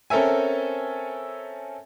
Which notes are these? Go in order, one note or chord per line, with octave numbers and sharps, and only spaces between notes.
C4 C#4 A4 A#4 E5 G#5